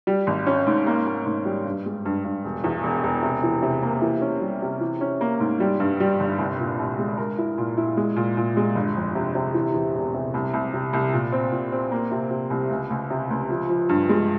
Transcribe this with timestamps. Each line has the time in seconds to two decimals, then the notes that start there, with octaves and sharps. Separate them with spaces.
0.07 G3
0.27 G#1
0.47 C#4
0.67 G#2
0.87 A#3
1.06 A#3
1.26 G#2
1.45 G3
1.65 G2
1.86 G#3
2.05 G2
2.24 G2
2.44 E1
2.64 E2
2.83 E1
3.04 E1
3.23 C3
3.43 E3
3.63 C3
3.82 A#3
4.02 E3
4.22 C#4
4.41 G3
4.62 C3
4.81 E3
5.01 C#4
5.21 A#3
5.40 G#2
5.60 G3
5.80 G2
6.00 G3
6.20 G1
6.38 C2
6.59 A#2
6.79 C2
6.98 G#3
7.18 A#4
7.38 E4
7.58 A#2
7.77 E4
7.97 G#3
8.16 A#2
8.37 A#2
8.57 G#3
8.75 G1
8.96 F2
9.15 C3
9.35 C3
9.54 E3
9.74 E2
9.95 E1
10.14 C3
10.34 C2
10.53 C2
10.74 C3
10.93 C2
11.13 A#2
11.32 C4
11.52 A#2
11.72 C4
11.91 A#3
12.11 C3
12.31 C3
12.50 C2
12.71 C#2
12.90 C#2
13.10 C3
13.30 C#2
13.50 F3
13.69 F3
13.89 G2
14.09 G#3